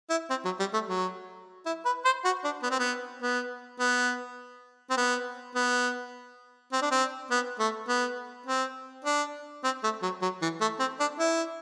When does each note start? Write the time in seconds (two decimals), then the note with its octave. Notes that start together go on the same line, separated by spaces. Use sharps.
0.10 E4
0.30 C4
0.45 F#3
0.60 G3
0.73 A3
0.88 F#3
1.66 E4
1.86 B4
2.05 C5
2.25 F#4
2.44 D4
2.63 B3
2.71 C4
2.79 B3
3.22 B3
3.80 B3
4.90 C4
4.97 B3
5.55 B3
6.72 C4
6.82 D4
6.92 C4
7.31 B3
7.59 A3
7.88 B3
8.46 C4
9.05 D4
9.64 C4
9.83 A3
10.03 F#3
10.22 F#3
10.42 E3
10.61 A3
10.80 C4
11.00 D4
11.19 E4